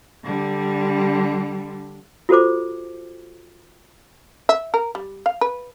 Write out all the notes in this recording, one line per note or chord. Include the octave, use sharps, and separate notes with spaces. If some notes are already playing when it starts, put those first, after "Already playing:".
D3 G3
F4 F#4 A4 C5 D6
E5
A#4
G3
F5
B4